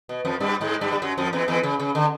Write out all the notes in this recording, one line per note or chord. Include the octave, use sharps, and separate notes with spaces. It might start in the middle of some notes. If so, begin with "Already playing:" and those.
B2
F2 F3
G2 G3
G#2 G#3
G2 G3
G3
F#2 F#3
F2 F3
E2 E3
E2 E3
C#3
C#3
D3